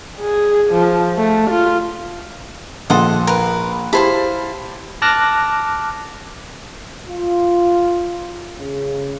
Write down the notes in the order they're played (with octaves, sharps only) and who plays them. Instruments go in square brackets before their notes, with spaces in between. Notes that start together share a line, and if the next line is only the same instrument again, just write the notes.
[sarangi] G#4
F3
A3
F4
[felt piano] A#1 F3 C6 [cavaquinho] A4 D#5 F#5
[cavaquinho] A#4 B4
[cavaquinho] E4 C5 F5 [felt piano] G4 A5 B5
[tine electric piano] A5 D6 F6 F#6 A#6
[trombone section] F4
C#3